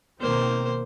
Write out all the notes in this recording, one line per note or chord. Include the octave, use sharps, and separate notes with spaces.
B2 D#3 A#3 C4 C5